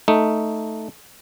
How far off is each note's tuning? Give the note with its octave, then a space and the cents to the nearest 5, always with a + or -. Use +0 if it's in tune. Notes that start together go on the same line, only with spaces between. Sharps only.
A3 +0 D#4 +0